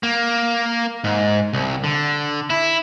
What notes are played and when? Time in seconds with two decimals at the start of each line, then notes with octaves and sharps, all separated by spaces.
0.03 A#3
1.04 G#2
1.54 C2
1.84 D3
2.50 E4